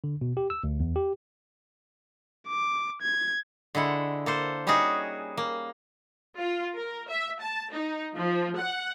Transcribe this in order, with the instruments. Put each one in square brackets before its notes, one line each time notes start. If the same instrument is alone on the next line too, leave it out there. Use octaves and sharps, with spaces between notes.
[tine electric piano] D3
B2
G4
E6
D2
E2
G4
[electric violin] D6
G#6
[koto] D3 G#3 E4 F#5
A#3 A4 C5
G3 C#4 D#4 F#4 G#4
A#3
[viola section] F4
A#4
E5
A5
D#4
F3
F#5